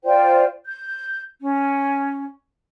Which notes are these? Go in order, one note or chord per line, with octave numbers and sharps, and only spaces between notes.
F4 C5 D5 G5
G6
C#4